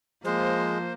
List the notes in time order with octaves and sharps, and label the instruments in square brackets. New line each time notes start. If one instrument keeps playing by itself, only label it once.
[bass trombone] F3 [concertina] G#3 [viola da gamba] A#3 [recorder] C5